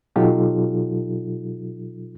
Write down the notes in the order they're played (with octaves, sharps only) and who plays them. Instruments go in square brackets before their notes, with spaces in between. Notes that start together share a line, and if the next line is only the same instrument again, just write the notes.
[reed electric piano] B2 F#3 D#4 F4 G4 A4